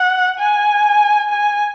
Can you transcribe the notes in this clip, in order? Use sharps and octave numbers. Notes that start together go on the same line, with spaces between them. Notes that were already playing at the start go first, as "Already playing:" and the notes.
Already playing: F#5
G#5
G#5